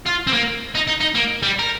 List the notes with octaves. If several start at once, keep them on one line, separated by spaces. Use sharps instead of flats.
F4
C4
A#3
D#4
D#4
D#4
A#3
G3
A#4